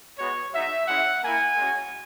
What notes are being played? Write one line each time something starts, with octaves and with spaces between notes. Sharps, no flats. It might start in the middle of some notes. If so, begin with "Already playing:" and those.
G#3 B3 F#4 C#5
G#3 D#4 F#4 E5
G#3 C#4 E4 F#5
A#3 E4 G#5
G#3 C#4 F#4